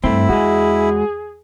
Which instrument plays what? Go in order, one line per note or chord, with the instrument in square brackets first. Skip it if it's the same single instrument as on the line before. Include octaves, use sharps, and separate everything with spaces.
[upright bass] G2 [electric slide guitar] A3 C4 [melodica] E4
[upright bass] E2 [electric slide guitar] G#3 F#4 [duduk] G#4